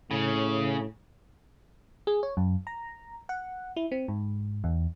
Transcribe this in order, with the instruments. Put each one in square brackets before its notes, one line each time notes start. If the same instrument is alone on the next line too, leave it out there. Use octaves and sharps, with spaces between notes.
[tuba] A2 [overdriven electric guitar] C#3
[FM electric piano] G#4
C#5
F#2
A#5
F#5
E4
C4
G#2
E2